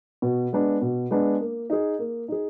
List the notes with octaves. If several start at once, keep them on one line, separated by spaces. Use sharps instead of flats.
B2
G#3 B3 D4
B2
G#3 B3 D4
A#3
D#4 G#4
A#3
D#4 G#4